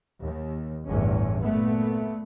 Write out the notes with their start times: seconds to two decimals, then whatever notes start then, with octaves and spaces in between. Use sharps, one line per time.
0.22 D#2
0.88 G1 E2 A2 C#4
1.42 A#2 A3 B3